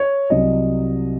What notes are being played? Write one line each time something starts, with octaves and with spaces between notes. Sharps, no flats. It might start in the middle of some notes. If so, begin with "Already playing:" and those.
Already playing: C#5
C2 C3 F#3 D#5